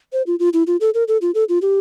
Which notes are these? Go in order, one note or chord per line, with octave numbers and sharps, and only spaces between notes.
C5
F4
F4
E4
F4
A4
A#4
A4
F4
A4
F4
G4